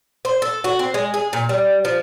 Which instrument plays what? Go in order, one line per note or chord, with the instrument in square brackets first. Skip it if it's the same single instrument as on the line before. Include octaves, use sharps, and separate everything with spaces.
[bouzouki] C5
A4
F#4
C4
G#3
G#4
A#2
G3
F3